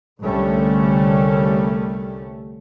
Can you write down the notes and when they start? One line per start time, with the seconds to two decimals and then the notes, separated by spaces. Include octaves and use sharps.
0.22 C2 D3 G3 A3 C#4